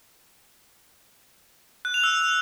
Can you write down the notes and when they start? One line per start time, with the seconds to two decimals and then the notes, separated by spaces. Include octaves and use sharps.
1.85 F#6
1.94 F7
2.04 E6